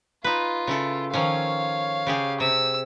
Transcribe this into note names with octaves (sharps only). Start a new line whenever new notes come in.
D#4 F4 B4
C#3 E4 A4
D#3 F3 C#4 C#5 F5
C#3 G4 G#4
C3 E6